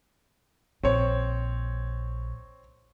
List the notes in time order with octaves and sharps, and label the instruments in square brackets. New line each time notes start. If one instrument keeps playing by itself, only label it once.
[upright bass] A#1 [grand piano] C4 C#5